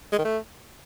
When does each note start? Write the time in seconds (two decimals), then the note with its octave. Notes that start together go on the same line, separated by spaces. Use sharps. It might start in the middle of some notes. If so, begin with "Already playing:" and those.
0.13 G#3
0.19 D#3
0.25 A3